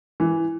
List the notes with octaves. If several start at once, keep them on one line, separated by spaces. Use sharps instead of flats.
E3